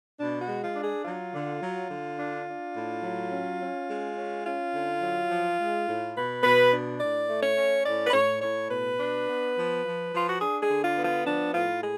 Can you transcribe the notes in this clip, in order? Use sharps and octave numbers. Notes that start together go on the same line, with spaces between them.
B2 D4
F#4
G#3
F4
D4
G#4
F#3 F4
D3
F#3
D3
D4
D4
A2
F#3
C#4
C#4
G#3
C#4
C#4 F4
D3
F#3
F3
G#3
A2
B2 B4
B2 B4
D4
A2 D5
A3
C#5
C#4
A2 D5
B4
A2 C#5
A2 C#5
B2 B4
D4
B3
F3
F3
F3 F4
F#4
D4 G#4
G#4
D3
F4
B3
F4
F3 D4
A2 F4
G#4